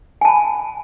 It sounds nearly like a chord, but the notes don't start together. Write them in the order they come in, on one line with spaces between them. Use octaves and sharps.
G#5 A5 B5